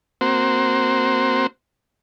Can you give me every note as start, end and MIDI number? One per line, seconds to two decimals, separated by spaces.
0.21 1.47 58
0.21 1.47 60
0.21 1.47 66
0.21 1.47 72